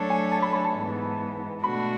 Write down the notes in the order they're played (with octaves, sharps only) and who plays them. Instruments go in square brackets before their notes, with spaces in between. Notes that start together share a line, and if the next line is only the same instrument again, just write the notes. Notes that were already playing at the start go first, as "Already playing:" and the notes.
Already playing: [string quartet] F#3 A3 D4 A4 C#5
[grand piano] G#5
A5
B5
B5
A5
[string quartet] G#2 E3 B3
[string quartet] B2 A3 D4 F#4 [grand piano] B5